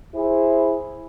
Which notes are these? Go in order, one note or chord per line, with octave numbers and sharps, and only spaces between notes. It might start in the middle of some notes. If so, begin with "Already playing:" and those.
E4 G#4 C5